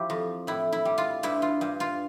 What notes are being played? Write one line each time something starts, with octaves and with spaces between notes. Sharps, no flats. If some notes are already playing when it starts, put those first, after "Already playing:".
Already playing: F3 E4 G4
F2
A2 E4
E4
G3
F4
G2 E4
F4
G2
F4